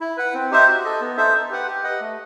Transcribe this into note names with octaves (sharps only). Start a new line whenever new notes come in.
E4
B4 F#5
C4
D#4 G4 C5 E5
F#4
A4 D#5
B3
D#4 A4 C5 E5
D#4
G4 B4 F#5
G4
B4 D#5 F#5
A3